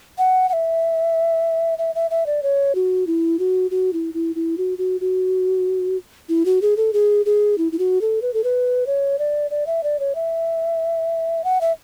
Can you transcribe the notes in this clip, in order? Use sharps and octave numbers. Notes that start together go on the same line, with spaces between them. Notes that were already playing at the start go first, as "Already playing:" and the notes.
F#5
F#5
E5
E5
E5
E5
D5
C#5
F#4
E4
F#4
F#4
E4
E4
E4
F#4
F#4
F#4
E4
F#4
G#4
A4
G#4
G#4
E4
E4
F#4
A4
B4
A4
B4
C#5
D5
D5
E5
D5
C#5
E5
F#5
E5